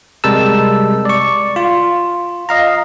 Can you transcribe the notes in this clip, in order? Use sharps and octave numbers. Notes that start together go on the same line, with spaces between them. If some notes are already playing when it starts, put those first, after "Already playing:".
C3 G3 G#3 A#4 A5 E6
D5 C#6
F4
D#5 F5 A#5